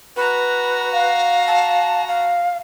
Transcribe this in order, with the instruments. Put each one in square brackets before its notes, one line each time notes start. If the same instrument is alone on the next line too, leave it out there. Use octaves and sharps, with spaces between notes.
[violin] F#4 A#5 [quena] B4
[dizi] F5
[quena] A5
F5